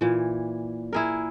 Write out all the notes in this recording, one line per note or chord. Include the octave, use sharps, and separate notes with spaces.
A#2 E3
E4 G#4 A#4